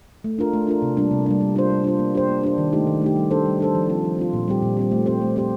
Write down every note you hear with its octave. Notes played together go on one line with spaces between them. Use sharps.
A3
D4 F4 A#4
A3
D4 F4 A#4
C3
G3 A#3 D4
C3
G3 A#3 D4
G3
D4 F4 C5
G3
D4 F4 C5
A#3
D4 G4 C5
A#3
D4 G4 C5
D#3
A3 D#4 G4
D#3
A3 D#4 G4
G3
D4 A4 C5
G3
D4 A4 C5
F3
C4 F4
F3
C4 F4
A#2
G3 C4 G4
A#2
G3 C4 G4
A3
C4 G4 C5
A3
C4 G4 C5